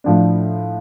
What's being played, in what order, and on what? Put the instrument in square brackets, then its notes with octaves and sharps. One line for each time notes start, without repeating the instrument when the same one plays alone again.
[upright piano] A2 F3 D4